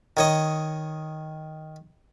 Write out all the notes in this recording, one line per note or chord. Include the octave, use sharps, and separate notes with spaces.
D#3 C#5 D#5